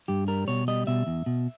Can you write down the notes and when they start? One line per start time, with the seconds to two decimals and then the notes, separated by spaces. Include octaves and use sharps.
0.08 G2 G4
0.28 G3 A#4
0.48 B2 C#5
0.68 G3 D#5
0.87 B2 E5
1.07 E2
1.26 B2